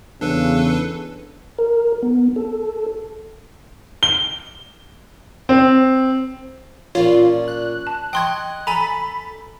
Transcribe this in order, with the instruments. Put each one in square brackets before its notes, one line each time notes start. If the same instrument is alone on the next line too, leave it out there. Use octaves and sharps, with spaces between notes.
[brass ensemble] E2 C#3 [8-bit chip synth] D4 A4 B4
[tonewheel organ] A#4
B3
A4
[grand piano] G7
C4
[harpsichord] A#2 C#4 D4 [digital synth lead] F4 [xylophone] C#5
[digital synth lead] F#6
[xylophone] A5
[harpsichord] D#5 C#6 [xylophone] G5 C6 G#6
[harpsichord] A4 [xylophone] G#5 A#5 [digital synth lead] B5